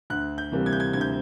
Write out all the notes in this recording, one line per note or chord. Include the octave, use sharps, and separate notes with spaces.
D2 F#6
G6
C3 E3 G3 A#3
G#6
G6
G#6
D2 G#6
G6